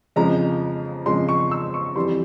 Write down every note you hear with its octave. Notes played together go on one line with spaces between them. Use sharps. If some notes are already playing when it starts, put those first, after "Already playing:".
F2 C#3 F3 G#3 A#5
F2 C#3 F3 G#3 C6
C#6
E6
C#6
F2 E3 G3 C6